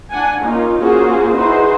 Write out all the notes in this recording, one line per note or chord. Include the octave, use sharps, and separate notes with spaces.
D4 F#5 G#5
A#3 C#4 D#4 F4
A#3 C#4 F4 F#4 G#4 C5
D#4 E4 F#4 G#4 B4 C5